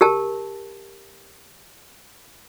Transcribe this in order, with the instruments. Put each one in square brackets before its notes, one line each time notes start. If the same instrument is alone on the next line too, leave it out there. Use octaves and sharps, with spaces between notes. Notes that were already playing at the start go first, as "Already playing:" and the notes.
[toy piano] G4 A#4 A5